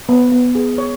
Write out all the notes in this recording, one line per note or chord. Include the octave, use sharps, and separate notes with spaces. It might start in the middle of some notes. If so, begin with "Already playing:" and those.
B3
B3
G#4
C#5